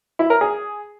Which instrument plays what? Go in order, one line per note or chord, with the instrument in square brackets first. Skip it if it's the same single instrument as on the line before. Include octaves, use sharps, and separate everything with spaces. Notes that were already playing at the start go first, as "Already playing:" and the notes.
[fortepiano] E4
A#4
G#4